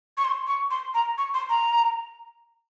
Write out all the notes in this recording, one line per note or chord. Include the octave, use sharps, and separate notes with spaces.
C#6
C6
C#6
C6
A#5
C#6
C6
A#5